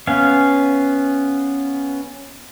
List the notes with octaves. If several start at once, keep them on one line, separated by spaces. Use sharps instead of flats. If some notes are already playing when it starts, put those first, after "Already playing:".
B3 C#4 F5